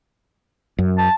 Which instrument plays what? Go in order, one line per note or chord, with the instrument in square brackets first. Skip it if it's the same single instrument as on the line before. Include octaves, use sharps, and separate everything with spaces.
[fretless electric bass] F#2
[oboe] A5